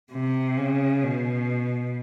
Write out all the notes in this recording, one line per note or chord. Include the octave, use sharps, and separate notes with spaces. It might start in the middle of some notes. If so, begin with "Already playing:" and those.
C3
C#3
B2